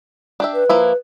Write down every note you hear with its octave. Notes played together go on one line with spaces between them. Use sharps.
D4 G4 E5
B4
F3 A#3 E4